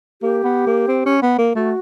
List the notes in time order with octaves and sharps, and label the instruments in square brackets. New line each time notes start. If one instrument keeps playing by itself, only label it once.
[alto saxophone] A#3 [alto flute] G4
[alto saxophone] B3
A#3
C4
C#4
B3
A#3
[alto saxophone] A3 [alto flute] F#4